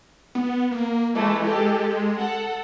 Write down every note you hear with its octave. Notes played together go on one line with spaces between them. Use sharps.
B3
A#3
E3 G#3 A3
G4 A4
A4 F#5